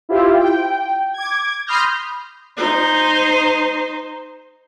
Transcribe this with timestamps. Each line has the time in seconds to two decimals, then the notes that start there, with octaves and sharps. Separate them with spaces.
0.09 E4 F4 G4 C5
0.38 G5
1.14 D6 G#6
1.66 B5 C6 D#6 F6 G6 A#6
2.57 D#4 C5